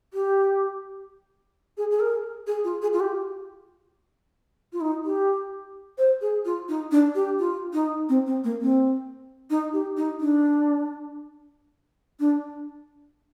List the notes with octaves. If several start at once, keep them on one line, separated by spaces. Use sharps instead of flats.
G4
G#4
G#4
A#4
G#4
F4
G#4
F4
G4
F4
D#4
G4
C5
G#4
F4
D#4
D4
G4
F4
D#4
C4
C4
A#3
C4
D#4
G4
D#4
D4
D4